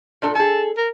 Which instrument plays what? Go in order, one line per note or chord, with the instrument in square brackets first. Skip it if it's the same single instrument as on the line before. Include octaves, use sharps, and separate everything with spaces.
[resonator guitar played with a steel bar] A#2 D4 A4
[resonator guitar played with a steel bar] G#4 A4 [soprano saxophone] A5
[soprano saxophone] A#4